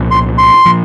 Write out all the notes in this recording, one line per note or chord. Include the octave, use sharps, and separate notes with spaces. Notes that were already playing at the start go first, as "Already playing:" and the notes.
Already playing: C2 A#2 F3
C6
C6
A#2 F3